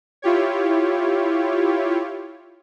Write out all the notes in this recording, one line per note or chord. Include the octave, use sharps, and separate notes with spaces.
E4 F4 G4 C#5